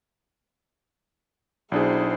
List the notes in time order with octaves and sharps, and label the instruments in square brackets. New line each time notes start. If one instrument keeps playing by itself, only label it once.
[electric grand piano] B1 D4 G#4 [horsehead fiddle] E4 C5